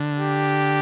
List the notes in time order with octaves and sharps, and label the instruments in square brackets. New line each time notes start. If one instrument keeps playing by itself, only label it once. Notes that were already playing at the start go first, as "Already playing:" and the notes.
Already playing: [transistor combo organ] D3
[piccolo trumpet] G4